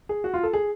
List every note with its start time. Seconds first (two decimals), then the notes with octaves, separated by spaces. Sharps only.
0.09 G#4
0.24 F#4
0.34 F4
0.43 A4
0.53 G#4